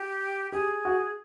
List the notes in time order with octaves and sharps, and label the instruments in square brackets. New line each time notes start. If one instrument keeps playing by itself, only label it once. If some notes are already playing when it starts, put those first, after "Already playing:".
Already playing: [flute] G4
[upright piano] G4 [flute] G#4
[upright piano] F#4